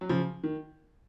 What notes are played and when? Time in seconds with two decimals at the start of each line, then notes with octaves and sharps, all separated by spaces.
0.01 F#3
0.09 C#3 F3
0.44 D#3